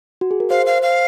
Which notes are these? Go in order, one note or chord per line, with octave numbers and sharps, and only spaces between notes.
F#4
G#4
A#4
C5 F5
F5
F5